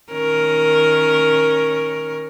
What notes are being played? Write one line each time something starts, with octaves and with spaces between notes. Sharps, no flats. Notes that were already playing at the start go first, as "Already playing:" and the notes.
D#3 C#4 A#4